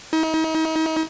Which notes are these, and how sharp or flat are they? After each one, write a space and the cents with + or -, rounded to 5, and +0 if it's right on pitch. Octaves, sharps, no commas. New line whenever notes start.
D#4 +40